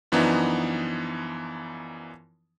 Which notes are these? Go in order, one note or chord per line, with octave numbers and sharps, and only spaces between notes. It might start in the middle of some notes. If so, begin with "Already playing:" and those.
F#2 E3 F3 B3 D4 D#4